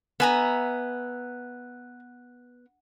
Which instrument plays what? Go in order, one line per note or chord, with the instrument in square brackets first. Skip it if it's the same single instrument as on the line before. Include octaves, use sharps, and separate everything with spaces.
[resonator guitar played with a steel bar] B3 [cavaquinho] E5 G#5 A#5